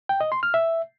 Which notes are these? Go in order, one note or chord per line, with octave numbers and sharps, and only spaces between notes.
G5
D#5
C6
F6
E5